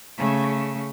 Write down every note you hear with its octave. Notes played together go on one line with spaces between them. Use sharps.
C#3 A3